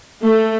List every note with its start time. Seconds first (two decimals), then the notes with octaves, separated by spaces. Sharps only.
0.24 A3